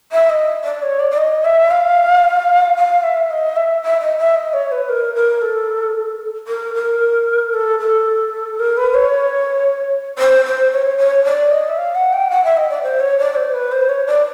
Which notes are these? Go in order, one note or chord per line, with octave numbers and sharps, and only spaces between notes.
E5
D#5
D5
C#5
D5
D5
D#5
E5
F5
F5
E5
D#5
E5
E5
D#5
E5
D#5
C#5
B4
A#4
A#4
A4
A#4
A#4
A4
A4
A#4
B4
C#5
C5
C5
C#5
C#5
D5
D#5
E5
F5
F#5
G5
F#5
E5
D#5
D5
C5
C#5
D5
C5
B4
C5
C#5
D5